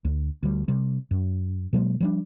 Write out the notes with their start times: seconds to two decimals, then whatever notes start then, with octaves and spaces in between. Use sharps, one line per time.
0.05 D2
0.43 D2 G3
0.68 C3 G3
1.11 F#2
1.73 B2 F#3 G#3 A#3
2.00 F3 G3 D4